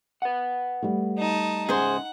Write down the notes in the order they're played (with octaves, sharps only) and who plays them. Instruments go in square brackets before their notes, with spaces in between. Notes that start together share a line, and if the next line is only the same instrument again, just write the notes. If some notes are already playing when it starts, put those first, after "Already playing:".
[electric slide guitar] B4 F#5
[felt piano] G3 A3
[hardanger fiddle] D#4 A5
[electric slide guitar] G#2 C#3 [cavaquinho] G#4 C5 [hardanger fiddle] F#5